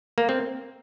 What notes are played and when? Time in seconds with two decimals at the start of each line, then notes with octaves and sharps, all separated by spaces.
0.18 A#3
0.29 C4